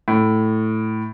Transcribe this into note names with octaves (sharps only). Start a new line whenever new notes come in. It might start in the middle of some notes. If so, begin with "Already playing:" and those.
A2